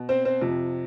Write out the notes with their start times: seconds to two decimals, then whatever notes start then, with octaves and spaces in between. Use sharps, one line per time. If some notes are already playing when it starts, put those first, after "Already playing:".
Already playing: B2
0.09 C4 C5
0.25 C4 C5
0.41 F2 C3 F3